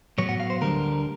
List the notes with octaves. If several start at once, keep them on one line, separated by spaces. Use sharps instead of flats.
A2 F#3 B3 C#5
F#5
F5
C5
D2 D3 G3 A#4